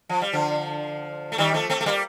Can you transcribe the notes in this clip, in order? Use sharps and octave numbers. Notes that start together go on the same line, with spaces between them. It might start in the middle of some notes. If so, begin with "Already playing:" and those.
F3
G3
D3 F3
A3
D#3 G3
F3 A3
A3 C4
A3
G3 A#3